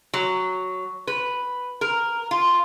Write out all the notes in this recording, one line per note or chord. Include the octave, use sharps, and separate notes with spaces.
F#3
B4
A#4
F4